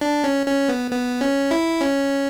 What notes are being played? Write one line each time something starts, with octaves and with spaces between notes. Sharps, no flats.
D4
C#4
C#4
B3
B3
C#4
E4
C#4